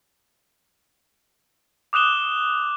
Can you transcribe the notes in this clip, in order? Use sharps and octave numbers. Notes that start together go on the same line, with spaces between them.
D6 D#6 F#6 E7 G7